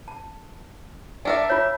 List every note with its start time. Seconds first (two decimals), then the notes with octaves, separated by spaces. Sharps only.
0.08 A5
1.25 D4 A#4 D5 E5 G5
1.50 F4 C#5